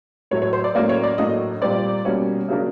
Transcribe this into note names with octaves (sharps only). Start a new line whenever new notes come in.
A2 F#3 A3 C#5
C#5
C5
D5
A2 F#3 A#3 C#4 D5
C#5
D5
A2 F#3 A#3 D4 D#5
A#2 G3 C4 D5
B2 G3 A#3 C#4
C#3 F#3 A#3 D4